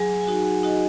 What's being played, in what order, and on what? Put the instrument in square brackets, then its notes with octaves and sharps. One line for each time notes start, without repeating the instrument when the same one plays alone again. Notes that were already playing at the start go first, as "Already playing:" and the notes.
Already playing: [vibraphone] F#3 G#4 G#5
G#5
D#4 F#4 F#5
D#4 F#4 D#5